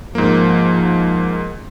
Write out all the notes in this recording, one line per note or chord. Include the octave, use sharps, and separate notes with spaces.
G#2 F3 A#3